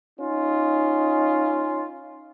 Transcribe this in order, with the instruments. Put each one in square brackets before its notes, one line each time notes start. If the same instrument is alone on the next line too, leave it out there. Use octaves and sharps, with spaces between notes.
[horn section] C#4 D#4 F4